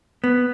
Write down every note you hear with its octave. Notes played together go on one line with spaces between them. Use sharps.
B3